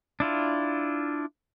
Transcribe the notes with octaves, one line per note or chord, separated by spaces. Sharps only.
D4 E4 F4